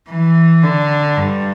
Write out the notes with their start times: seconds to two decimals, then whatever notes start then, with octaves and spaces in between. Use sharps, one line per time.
0.09 E3
0.63 D3
1.17 G2